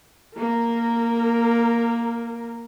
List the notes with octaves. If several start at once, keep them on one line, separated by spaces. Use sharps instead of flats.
A#3 A#4